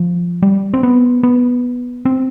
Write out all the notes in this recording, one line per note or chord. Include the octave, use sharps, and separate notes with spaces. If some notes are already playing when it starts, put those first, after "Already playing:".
Already playing: F3
G3
C4
B3
B3
C4